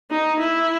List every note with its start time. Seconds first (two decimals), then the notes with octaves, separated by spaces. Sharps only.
0.11 D#4
0.40 E4